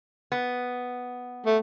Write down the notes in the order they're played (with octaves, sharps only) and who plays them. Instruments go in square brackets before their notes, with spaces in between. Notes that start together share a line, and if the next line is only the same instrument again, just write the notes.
[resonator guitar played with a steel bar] B3
[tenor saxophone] A3